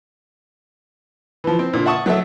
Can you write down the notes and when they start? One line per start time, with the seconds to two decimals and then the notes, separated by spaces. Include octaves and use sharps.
1.44 E3 F3
1.59 C4
1.73 A#2 D3
1.86 E5 F#5 A5 C#6 D#6
2.06 F#3 A3 A4 E5